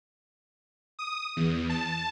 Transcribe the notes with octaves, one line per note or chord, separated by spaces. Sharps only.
D#6
E2
A5